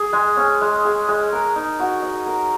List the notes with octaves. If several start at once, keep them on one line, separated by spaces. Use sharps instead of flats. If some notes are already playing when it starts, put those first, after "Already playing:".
Already playing: G#4
G#3
C#4
G#3
G#4
G#3
A#4
D#4
F#4
D#5
A#4